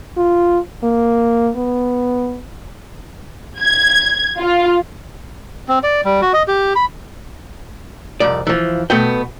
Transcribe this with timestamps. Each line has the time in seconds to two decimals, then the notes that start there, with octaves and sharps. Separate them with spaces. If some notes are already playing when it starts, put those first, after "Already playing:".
0.17 F4
0.83 A#3
1.56 B3
3.60 G#6
4.39 F4
5.69 C4
5.83 D5
6.05 G3
6.22 F#4
6.33 D#5
6.48 G4
6.75 B5
8.20 C2 F2 D5
8.47 E3 F3
8.90 B2 A3 B3 G5